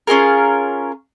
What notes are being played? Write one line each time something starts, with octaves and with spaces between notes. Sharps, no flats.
C#4 F4 G#4 A#4